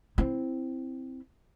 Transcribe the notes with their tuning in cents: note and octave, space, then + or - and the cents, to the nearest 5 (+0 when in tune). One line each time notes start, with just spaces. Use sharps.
C4 +0 E4 +0